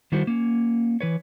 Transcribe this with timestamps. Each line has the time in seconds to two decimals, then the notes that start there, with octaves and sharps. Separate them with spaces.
0.12 D#3 G3 E4 F#4 C5
0.27 A#3 C#4
1.01 E3 B4 C#5